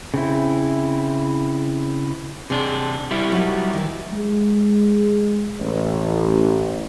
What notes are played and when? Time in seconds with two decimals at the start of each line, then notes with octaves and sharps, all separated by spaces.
0.14 C#3 C4 E4
2.50 C3 D4 G#4
3.11 G3 E4
3.32 F#3 D#4
3.73 D#3 E3
4.12 G#3
5.60 A1